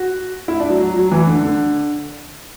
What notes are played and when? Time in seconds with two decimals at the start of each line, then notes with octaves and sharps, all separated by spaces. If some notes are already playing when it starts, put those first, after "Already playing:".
Already playing: F#4
0.48 E4
0.60 D4
0.70 F#3
0.80 F#3
0.96 F#3
1.12 E3
1.27 D3
1.43 D3